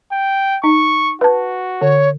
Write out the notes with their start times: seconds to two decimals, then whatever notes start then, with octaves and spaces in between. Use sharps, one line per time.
0.12 G5
0.64 D#4 C#6
1.21 F#4 B4 A5
1.81 D3 C#5